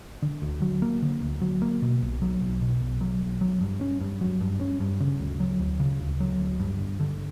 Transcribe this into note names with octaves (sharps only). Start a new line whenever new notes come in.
D3
D2
F#3
A#3
D3
D2
F#3
A#3
B2
B1
F#3
B1
B2
B1
F#3
B1
F#3
G2
C#4
G2
F#3
G2
C#4
G2
C#3
D2
F#3
D2
C#3
D2
F#3
D2
G2
G1
D3